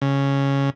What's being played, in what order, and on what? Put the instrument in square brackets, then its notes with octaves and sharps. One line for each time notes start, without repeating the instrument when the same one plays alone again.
[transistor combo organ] C#3